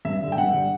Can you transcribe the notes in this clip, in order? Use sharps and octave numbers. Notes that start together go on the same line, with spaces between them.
G2 E5
D3 G3
G5
G2 F#5
D3 G3